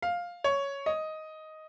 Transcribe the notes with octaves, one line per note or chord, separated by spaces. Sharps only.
F5
C#5
D#5